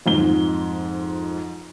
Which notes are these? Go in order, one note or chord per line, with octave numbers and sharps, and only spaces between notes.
F2 G#2 G7